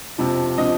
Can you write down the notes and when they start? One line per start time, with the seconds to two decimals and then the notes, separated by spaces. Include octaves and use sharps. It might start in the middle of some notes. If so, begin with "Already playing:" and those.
0.18 F2 C3 F3
0.58 C3 F3 D#5